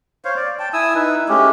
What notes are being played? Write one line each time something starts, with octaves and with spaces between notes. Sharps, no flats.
C5 C#5 F5
D5
G5 A5
E4 G#5 D#6 E6
D#4 E4 B4
G#3 A3 C#4 G4